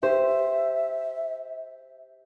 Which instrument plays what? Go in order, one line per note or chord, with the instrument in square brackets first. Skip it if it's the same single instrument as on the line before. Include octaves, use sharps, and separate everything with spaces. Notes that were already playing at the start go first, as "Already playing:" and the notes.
[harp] G4 C5 [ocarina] E5